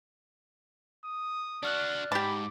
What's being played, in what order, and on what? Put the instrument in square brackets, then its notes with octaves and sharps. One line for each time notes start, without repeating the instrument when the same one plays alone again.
[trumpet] D#6
[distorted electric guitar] D4 F#4 [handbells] D5 F6 F#6
[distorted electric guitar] G#2 [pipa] G4 A5 [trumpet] B5 [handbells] D6